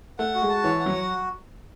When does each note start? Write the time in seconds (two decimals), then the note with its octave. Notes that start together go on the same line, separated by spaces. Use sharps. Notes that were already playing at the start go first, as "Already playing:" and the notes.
0.19 A3 F#5
0.35 F#4
0.42 G#3
0.49 A5
0.64 E3 C#5
0.80 F#5
0.86 F#3
0.94 F#4